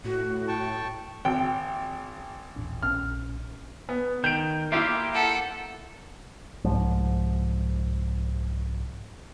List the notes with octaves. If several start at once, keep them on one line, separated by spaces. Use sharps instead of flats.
A2 F#4
G5 A5 C#6
G#1 G5
D#1 A1 D4
A#1 C#4 F6
B3
D#3 G6 D7
A#3 E4 F4 G4 E5
A4 F#5
C2 G#2 F3